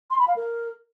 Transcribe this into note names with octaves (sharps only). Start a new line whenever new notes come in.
C6
B5
F5
A#4